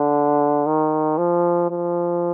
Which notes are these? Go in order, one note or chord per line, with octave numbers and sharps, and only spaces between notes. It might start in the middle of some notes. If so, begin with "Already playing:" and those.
Already playing: D3
D#3
F3
F3